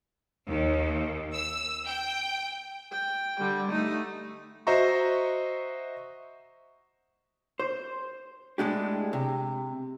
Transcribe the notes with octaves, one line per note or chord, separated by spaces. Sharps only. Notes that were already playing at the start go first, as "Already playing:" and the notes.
D#2
E6
G5
G5
D3 G3
A3 D#4
F#4 C5 D#5 E5 A#5 C#6
C5
A2 G#3 D4 G4
C3